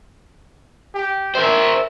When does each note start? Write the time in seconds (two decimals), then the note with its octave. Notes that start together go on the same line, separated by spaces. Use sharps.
0.95 G4
1.35 A#4 C5 E5